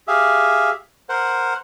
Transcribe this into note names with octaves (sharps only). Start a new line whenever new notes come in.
G4 G#4 E5 F5
A#4 C5 F#5